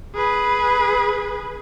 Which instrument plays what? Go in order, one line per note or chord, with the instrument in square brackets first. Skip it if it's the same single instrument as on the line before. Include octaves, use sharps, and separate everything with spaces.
[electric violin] G#4 B4